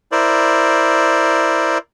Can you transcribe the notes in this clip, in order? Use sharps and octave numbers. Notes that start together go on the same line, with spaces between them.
E4 A#4 C5 D5